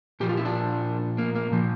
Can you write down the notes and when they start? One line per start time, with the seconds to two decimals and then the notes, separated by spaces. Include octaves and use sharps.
0.20 A#2 F3 G4
0.29 F4
0.37 E4
0.45 D4
1.18 A#3
1.35 A#3
1.52 A#2 F3